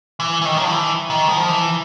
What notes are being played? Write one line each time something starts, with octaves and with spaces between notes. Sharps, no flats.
E3
E3
D#3
F#3
F3
E3
D#3
F3
E3